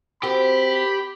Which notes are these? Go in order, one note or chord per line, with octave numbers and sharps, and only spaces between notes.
C4 F#4 G4 A#4 B5